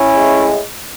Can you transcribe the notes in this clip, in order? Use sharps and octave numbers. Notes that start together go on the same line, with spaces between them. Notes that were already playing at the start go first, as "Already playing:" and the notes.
Already playing: C#4 E4
A2 G#3